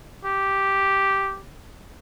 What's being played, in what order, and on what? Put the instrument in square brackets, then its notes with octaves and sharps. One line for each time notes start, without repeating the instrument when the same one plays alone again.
[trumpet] G4